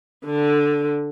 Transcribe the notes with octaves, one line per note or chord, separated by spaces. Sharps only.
D3